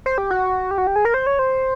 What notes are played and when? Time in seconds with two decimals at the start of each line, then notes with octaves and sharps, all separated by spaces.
0.06 C5
0.18 G4
0.31 F#4
0.71 G4
0.78 F#4
0.87 G4
0.96 G#4
1.05 A#4
1.14 C5
1.27 C#5
1.39 C5